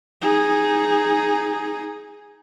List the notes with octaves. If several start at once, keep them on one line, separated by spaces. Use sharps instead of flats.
D#4 G#4